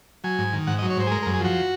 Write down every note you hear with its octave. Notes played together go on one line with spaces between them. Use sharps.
F#3 G#5
G#2
D#3
G#2 F#5
D#5
F#3
C#5
G#2 C5
G#4
G#3 A#4
A#4
F#2
G#4
F3 F#4